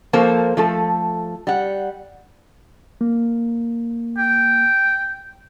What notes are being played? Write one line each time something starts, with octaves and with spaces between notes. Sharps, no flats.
F3 A#3 A4 C5
F3 A3 A4
G3 F#5
A#3
G5